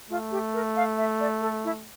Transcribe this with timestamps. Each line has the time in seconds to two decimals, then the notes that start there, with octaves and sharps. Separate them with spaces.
0.10 A3 F4
0.31 G4
0.54 A#4
0.76 F5
0.98 E5
1.20 D5
1.41 A4
1.64 E4